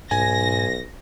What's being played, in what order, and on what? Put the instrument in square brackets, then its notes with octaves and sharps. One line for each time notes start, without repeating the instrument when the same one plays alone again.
[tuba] B1 [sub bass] G#2 [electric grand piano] G#5 [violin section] A#6